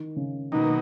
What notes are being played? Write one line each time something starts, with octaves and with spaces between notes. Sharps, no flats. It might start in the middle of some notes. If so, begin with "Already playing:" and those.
Already playing: D#3
C#3
B2 D#3 F#3 A#3 D#4